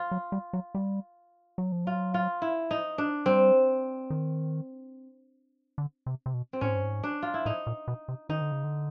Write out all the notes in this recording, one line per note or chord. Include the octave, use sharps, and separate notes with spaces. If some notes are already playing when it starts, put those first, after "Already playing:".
Already playing: F4
F#3
G3
F#3
G3
F#3
F3
F#3 F4
F4
E4
D#4
D4
G3 C4
D#3
D3
C3
C3
B2
C4
A2 C#4
G#2
G2
G#2
D4
F4
E4
A2 D#4
A#2
B2
C3
D#3 D#4
D3
C#3
D3